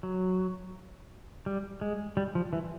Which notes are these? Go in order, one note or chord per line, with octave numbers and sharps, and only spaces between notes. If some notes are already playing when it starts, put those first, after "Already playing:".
F#3
G3
G#3
G3
F3
E3